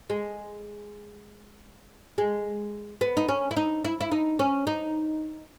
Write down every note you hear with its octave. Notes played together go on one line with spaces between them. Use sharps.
G#3
G#3
B3
D#4
C#4
E4
D#4
E4
E4
D#4
C#4
D#4